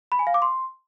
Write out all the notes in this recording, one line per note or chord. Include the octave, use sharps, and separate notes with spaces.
B5
G#5
F5
D6
C6